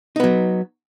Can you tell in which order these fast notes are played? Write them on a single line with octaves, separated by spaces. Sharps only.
D#4 B3 F#3